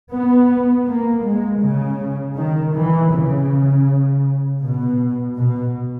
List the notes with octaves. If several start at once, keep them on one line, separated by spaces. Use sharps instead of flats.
B3
A#3
G#3
C#3
D#3
E3
C#3
B2
B2